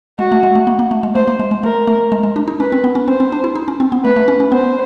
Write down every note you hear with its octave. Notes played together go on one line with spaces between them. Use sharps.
G#3 F#4
A3
G#3
A3
A#3
A#3
A3
G#3
A3 C5
A#3
G#3
G#3
A3 A#4
A3
G#3
G#3
D4
D#4
C#4 B4
C4
B3
C#4
C4 C5
C4
D4
E4
D#4
C#4
C4
B3
A3 B4
A3
C#4
C#4
B3 C5